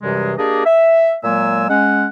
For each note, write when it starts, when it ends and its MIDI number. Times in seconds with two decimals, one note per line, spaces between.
0.02 0.32 42
0.02 0.32 48
0.02 0.32 52
0.02 0.32 55
0.02 0.32 56
0.37 0.62 58
0.37 0.62 62
0.37 0.62 67
0.37 0.62 68
0.37 0.62 74
0.37 0.62 75
0.65 1.14 76
1.23 1.66 46
1.23 1.66 54
1.23 1.66 56
1.23 1.66 58
1.23 1.66 80
1.23 1.66 88
1.69 2.05 56
1.69 2.05 61
1.69 2.05 78